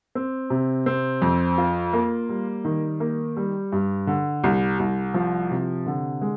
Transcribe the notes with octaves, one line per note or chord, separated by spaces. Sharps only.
C4
C3
C4
F2
F4
A#3
G3
D#3
A#3
G3
G2
D3
C2
C2
F3
C3
D3
G#3